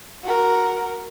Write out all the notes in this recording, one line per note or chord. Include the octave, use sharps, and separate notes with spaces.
F#4 A#4